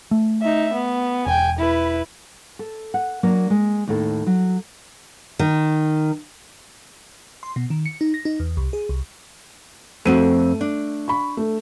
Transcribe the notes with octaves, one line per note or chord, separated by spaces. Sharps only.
A3
D#4 E5
B3
E1 G5 G#5
E4 B4
A4
F#5
F#3 A#3 D4 A#4
G#3
D#2 A2 A4
F#3
D#3
C6
B2
D#3
C#7
D#4
A#6
D#4
E2
C2
G#4
C2
F2 A3 C4 F#4 D#7
D4
B5 C#6
A3